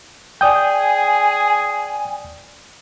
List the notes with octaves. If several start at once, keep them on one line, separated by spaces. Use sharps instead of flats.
G#4 D5 G5 G#5 D#6 G6